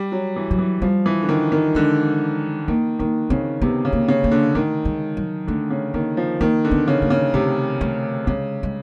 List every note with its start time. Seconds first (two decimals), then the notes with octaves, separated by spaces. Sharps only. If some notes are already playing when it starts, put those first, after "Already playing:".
Already playing: G3
0.12 F#3
0.36 E3
0.51 F#3
0.59 E3
0.82 F3 G3
1.06 E3
1.22 D3
1.29 D#3
1.52 D#3
1.75 D3 G#3
2.68 D#3 A#3
2.99 D#3 A#3
3.30 C#3 C4
3.62 C3 B3
3.85 C#3
3.93 A#3
4.08 C#3
4.24 A#3
4.31 D3
4.55 D#3 A3
4.85 G#3
5.17 F#3
5.47 D3 A3
5.70 C#3
5.94 D#3 A#3
6.17 F3
6.41 D#3 A#3
6.65 D3
6.71 B3
6.88 C#3
7.02 A#3
7.10 C#3
7.34 C3 A3
7.81 A3
8.27 C#3 G#3
8.63 G#3